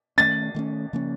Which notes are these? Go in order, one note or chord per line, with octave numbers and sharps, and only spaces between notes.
D#3 A3 C#4 A6
D#3 A3 C#4
C#3 F3 A#3 C#4